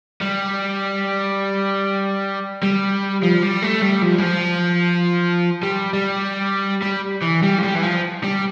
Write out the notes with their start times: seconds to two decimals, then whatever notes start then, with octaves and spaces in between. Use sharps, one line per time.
0.22 G3
2.63 G3
3.23 F3
3.42 G3
3.62 A3
3.82 G3
4.02 F3
4.18 G3
4.22 F3
5.63 G3
5.93 G3
6.82 G3
7.23 E3
7.43 G3
7.59 F3
7.63 G3
7.75 E3
7.83 F3
8.24 G3